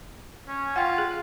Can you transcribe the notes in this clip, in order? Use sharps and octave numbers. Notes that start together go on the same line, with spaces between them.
C#4
F4 F#5 G5
G#4